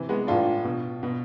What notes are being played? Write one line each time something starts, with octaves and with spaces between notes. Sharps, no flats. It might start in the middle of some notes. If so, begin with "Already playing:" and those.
Already playing: C3 E3
G#3 B3
A2 E3 D4 F4
B2
B2